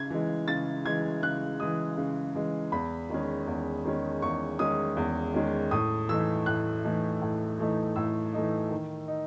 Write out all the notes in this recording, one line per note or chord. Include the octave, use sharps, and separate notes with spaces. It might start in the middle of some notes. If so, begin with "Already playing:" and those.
Already playing: C#3 G#6
E3 G#3
C#3 A6
E3 G#3 G#6
C#3 F#6
E3 G#3 D#6
C#3
E3 G#3
E2 B5
D#3 G#3 C#4
E2
D#3 G#3 C#4
E2 C#6
D#3 G#3 C#4 D#6
E2
D#3 G#3 C#4
A2 D#6
E3 A3 D#4 E6
A2 F#6
E3 A3 D#4
A2
E3 A3 D#4
A2 E6
E3 A3 D#4
D#3
D#4